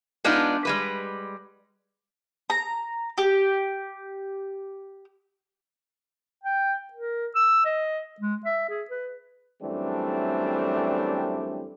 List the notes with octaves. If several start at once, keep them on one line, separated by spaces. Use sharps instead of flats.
G#3 B3 D4 D#4 F4
G3 G#3 B4
A#5
G4
G5
A#4
E6
D#5
G#3
E5
G#4
B4
F#2 E3 G3 A3 C4 D4